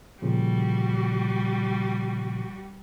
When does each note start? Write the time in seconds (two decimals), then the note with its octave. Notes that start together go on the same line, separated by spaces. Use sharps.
0.22 A#2 C#3 F3 G3 F#4